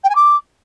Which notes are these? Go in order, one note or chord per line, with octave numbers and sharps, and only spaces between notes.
G5
G#5
D6